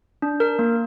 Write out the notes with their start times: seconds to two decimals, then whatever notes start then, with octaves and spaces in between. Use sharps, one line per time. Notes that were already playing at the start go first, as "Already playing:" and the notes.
0.22 D4
0.40 A#4
0.59 A#3